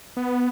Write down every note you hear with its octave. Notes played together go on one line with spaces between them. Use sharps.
B3